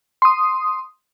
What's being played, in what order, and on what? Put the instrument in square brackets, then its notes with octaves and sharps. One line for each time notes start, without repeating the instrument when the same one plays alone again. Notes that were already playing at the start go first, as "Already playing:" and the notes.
[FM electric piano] C6 D#6